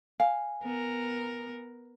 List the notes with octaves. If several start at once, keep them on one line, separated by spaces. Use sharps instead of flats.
F5 G#5
B3 A#4